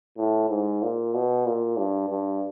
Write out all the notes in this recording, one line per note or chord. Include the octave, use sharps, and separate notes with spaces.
A2
G#2
A#2
B2
A#2
G2
G2